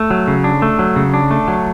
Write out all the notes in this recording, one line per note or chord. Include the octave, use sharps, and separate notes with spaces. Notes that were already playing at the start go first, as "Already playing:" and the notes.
Already playing: A3
F#3
C#3
D4
A3
F#3
C#3
D4
A3
F#3